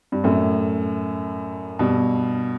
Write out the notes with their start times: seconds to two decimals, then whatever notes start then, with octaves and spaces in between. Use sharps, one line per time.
0.12 G2
0.24 F#2 A2
1.79 G2 B2